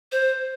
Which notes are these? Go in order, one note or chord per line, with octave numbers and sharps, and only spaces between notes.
C5